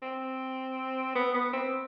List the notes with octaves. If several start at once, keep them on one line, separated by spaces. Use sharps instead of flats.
C4
B3
B3
C4